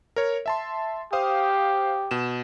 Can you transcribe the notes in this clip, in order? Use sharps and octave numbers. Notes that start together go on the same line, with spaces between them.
A#4 C#5
E5 A5 C6
G4 C5 F5 D#6
B2 E7